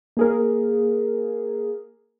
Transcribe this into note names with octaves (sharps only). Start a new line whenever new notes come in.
A#3 G#4 A#4